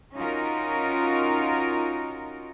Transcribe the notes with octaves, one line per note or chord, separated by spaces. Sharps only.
C#4 D#4 F4 F#4 A#4